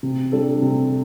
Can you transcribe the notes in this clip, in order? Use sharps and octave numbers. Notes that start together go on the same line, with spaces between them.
C3
G3 D4 A4
C3